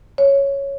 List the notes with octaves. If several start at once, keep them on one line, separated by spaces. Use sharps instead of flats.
C#5